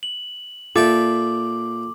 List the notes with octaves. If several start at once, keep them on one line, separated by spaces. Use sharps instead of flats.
F#7
A#2 F4 A4 E5 G5 D6